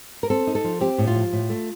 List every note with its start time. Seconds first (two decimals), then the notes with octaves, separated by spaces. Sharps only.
0.23 A#4
0.30 C4 A4
0.47 D#4
0.55 A4
0.64 F3
0.81 C4 G4
0.98 A2
1.07 F4
1.15 F3
1.33 A2
1.50 A3